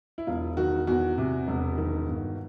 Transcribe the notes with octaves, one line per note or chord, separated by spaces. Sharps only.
E4
E1 F4
D#3 F#4
E2 F#4
C3
E1
D#3
G1